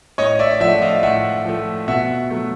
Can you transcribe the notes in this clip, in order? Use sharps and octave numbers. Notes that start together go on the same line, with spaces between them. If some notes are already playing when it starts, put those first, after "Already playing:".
A2 C#5 D#5
D5 E5
F3 A3 E5 F#5
D#5 F5
A2 E5 F#5
F3 A3
B2 E5 F#5
F#3 A3